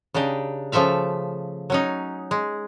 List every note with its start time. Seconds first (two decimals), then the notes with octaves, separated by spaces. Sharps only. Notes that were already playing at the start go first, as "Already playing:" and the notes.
0.14 C#3 D4 D#4 G4
0.72 C#3 F3 A3 E5 F5
1.70 F#3 C#4 D#4
2.31 G#3